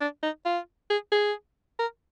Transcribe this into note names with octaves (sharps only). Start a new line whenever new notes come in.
D4
D#4
F4
G#4
G#4
A#4